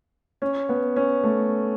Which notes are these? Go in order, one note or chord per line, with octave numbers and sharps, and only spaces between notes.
C#4
B3
C#4
A3